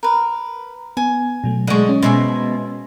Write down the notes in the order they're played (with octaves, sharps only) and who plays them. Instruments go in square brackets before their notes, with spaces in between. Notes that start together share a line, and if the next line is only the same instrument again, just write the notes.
[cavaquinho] A#4 B4
[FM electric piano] B3 [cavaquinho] G#5
[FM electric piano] B2 F#3 A3
[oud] D3 G#3 [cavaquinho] D#5 C#6
[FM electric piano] C#4
[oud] B2 G#3 [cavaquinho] C5 E5 G#5